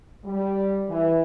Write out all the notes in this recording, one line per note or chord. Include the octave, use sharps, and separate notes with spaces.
G3
E3